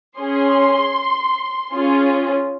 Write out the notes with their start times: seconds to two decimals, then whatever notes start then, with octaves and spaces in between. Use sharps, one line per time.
0.18 C#4 G#4 C6
1.74 C#4 F4 G#4